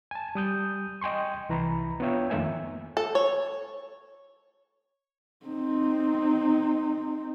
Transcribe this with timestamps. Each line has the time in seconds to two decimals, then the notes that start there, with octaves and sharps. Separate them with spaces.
0.11 G#5 A5
0.35 G3 D#6 G6
1.01 D#5 G5 G#5 C6 C#6
1.49 C2 E3 A#5 B5
2.00 B3 D4 F4 C#5 E5 G5
2.30 F2 D#3 A3 A#3 E5 G#5
2.97 A4
3.15 C#5
5.46 C4 D#4